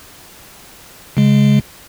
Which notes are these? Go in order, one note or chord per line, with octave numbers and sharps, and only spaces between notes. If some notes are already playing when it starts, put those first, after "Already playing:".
C#3 G#3